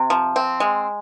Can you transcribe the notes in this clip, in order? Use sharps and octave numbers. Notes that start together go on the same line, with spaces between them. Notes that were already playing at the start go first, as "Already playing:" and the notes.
Already playing: C3
F3
C4
G#3